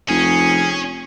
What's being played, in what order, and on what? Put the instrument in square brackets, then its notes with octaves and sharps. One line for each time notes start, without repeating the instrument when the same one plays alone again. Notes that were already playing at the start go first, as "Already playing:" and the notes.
[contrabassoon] F1 [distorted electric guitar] C#4 [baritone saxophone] G#4